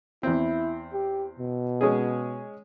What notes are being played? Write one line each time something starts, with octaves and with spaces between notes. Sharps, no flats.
E2 C4 E4
G4
B2
G#3 C#4 G#4